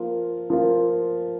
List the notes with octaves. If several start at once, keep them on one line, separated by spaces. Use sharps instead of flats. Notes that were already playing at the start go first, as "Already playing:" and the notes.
Already playing: F3 A#3 F4
F3 A#3 F4